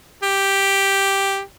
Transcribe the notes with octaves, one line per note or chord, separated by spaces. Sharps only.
G4